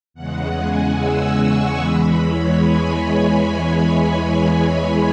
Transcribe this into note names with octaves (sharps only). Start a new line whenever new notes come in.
E2 C#3 G#3 F#5
G#5
E6
C#6
E2 E3 G#3 B5
C#5
G#5